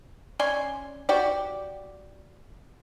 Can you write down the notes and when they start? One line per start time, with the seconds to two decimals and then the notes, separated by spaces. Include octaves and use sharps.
0.39 C#4 D5 G#5 C6
1.09 F#4 G4 D5